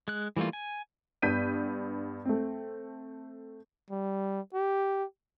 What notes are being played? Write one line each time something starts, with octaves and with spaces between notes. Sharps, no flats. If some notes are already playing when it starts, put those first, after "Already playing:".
G#3 F#6
E3 G3 A3 A#3 F4
G#5
G2 B3 G6 B6 D#7
A3 C4
G3
G4